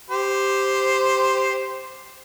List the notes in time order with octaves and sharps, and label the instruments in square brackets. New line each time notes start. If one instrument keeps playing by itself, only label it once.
[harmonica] G4 C5